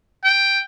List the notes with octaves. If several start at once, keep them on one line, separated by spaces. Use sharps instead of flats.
G5